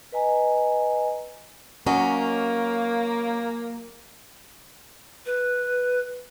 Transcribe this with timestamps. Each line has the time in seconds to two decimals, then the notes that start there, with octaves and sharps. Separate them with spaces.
0.12 B4 D#5 G#5 A#5
1.87 F#3 A#3 C#4 D#5
5.26 B4